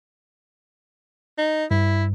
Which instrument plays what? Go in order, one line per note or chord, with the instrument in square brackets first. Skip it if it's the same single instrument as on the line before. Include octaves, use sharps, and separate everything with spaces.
[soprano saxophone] D#4
[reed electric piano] G2 [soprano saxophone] E4